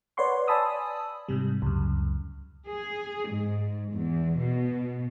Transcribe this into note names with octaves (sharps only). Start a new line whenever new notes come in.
B4 C#5 D5 F#5 C6 C#6
D5 G#5 A5 B5 D#6 E6
G#2 C3 G3
C#2 F#2
G#4
G#2
E2
B2